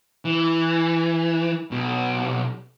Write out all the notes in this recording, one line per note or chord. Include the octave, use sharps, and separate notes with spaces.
E3
B1 B2